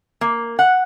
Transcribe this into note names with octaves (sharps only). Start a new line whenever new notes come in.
A#3
F#5